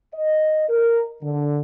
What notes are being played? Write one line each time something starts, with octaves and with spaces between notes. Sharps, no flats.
D#5
A#4
D3